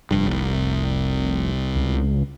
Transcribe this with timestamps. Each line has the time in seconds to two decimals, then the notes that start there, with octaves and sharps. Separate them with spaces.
0.11 F1 G2
0.28 C2
1.76 C#2